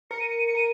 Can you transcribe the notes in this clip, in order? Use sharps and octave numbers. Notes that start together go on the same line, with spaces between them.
A#4 C#7
D#7
C#7
D#7
C#7
A#4 D#7